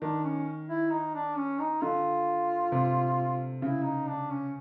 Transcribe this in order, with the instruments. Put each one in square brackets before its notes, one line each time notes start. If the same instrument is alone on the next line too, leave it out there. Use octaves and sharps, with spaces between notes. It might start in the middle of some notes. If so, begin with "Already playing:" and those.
[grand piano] D#3 [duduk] D4
[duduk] C#4
E4
D#4
D4
C#4
D#4
[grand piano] D3 [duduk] F4
[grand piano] C3
[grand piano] C#3 [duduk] E4
[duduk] D#4
D4
C#4